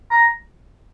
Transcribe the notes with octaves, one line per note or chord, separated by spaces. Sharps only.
A#5